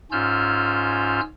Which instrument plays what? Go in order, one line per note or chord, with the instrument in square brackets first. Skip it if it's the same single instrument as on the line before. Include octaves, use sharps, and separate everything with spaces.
[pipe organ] G#2 C#4 F4 E6 F6 G6